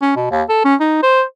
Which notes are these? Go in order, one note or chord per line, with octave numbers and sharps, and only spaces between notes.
C#4
B2
D#2
A4
C#4
D#4
C5